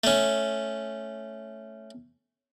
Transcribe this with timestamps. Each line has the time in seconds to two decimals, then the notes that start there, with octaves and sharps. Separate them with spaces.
0.04 A3 C#4